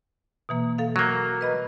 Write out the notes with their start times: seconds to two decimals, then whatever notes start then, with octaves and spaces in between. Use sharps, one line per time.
0.49 B2 E3 A#3
0.78 A4 F5
0.96 F#3 A#3
1.41 B4 D#5 B5